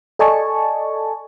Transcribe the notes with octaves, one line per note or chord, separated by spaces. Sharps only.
A4 D5 D#5 G#5 A5 C#6